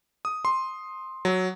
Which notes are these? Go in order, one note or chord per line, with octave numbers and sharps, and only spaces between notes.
D#6
C6
F#3